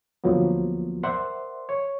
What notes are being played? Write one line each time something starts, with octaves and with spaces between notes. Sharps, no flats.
D2 F3 F#3 A#3 B3
A#4 C5 D5 E5 F#5 C6
C#5